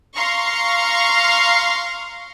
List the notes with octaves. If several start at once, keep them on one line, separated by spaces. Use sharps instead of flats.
F5 A#5 C6 C#6